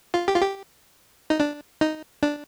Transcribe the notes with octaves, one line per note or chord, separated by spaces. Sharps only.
F4
G4
F4
G4
D#4
D4
D#4
D4